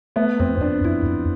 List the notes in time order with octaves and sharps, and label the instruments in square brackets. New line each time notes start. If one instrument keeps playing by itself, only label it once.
[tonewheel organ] A3 [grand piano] B3
[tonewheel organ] F2 [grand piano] C4
[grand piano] C4
[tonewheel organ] F2 [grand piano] D4
[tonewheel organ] F2 [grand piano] E4
[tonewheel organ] F2